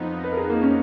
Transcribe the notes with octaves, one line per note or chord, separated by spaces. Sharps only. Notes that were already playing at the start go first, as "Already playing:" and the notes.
Already playing: F2 F3 B3 D#4
B4
A#4
G#4
A#3
C#4